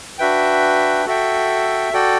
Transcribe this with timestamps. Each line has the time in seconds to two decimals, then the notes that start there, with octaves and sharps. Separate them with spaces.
0.18 D4 F#4 B4 E5 G5
1.06 F#4 A4 E5 G5
1.93 F#4 A4 D5 G5